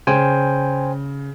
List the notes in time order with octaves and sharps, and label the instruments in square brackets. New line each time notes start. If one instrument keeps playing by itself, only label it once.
[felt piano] C#3 [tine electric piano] C5 G5 G#5